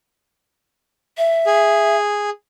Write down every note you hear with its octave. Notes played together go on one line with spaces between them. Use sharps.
E5
G#4